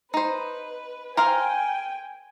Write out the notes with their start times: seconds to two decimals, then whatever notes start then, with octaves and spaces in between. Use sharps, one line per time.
0.14 D#4 B4 C5
1.17 A#4 C5 F5 G5 G#5